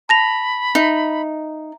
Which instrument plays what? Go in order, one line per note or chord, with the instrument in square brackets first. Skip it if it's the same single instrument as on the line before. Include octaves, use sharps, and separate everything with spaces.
[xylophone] A5 A#6 F7 [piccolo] B5
[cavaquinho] D#4 [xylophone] E5